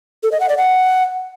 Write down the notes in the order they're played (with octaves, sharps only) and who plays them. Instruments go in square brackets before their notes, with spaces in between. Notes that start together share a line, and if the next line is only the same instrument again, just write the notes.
[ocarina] A4
D#5
F#5
D5
F#5